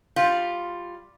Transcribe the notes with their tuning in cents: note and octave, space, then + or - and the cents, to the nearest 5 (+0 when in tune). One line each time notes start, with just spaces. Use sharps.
G3 +0 F4 +0